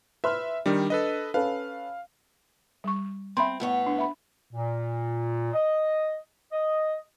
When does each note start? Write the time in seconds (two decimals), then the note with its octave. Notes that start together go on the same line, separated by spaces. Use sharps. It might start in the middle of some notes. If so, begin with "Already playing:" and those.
0.24 B4 E5 C6 F6
0.66 D#3 G3 D4
0.90 A4 B4 D#5
1.34 C#4 A4 B4 F5
2.84 G3 C#6
3.37 C4 E5 B5 C6
3.60 A2 B3 C#5
3.87 D4
3.98 E5 B5
4.52 A#2
5.53 D#5
6.52 D#5